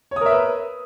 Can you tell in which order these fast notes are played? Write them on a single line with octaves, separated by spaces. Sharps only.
C#5 D#6 A#4 E5 B4